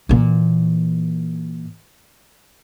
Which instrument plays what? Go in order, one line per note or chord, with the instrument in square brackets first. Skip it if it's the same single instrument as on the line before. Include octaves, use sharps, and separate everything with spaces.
[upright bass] A#2 E3